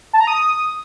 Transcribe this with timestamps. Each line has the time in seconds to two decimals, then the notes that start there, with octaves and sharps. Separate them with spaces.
0.13 A5
0.20 A#5
0.27 D#6